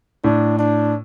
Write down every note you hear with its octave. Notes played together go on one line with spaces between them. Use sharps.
A2 D4
D4